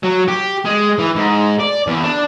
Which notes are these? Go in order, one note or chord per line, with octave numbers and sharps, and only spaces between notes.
F#3
G4
G#3
E3
G#2
D5
E2
D4